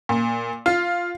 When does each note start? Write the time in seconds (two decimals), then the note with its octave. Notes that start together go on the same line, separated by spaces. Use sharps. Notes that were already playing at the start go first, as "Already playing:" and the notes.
0.09 A#2
0.66 F4